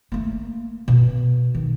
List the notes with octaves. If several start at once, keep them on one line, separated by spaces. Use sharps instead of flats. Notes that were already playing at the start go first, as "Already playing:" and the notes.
A3 A#3
B2
D#3